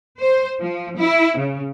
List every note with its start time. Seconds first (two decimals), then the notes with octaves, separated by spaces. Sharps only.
0.20 C5
0.60 F3
0.98 E4
1.37 C#3